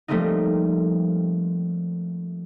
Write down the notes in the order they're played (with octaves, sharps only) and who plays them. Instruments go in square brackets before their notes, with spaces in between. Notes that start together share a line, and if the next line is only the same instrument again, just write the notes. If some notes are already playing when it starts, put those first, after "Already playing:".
[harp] F3 G3 A3 A#3 C4 D#4